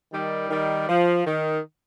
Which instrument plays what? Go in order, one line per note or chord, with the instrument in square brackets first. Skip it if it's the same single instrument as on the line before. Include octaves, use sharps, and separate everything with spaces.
[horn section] D#3 G3
D#3 G3
F3
D#3